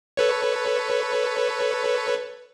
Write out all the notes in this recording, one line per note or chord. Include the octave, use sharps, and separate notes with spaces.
A4 B4 C#5